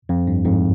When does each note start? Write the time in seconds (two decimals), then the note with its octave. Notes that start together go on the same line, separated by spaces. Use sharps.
0.09 F2
0.27 G2
0.44 F2 G#2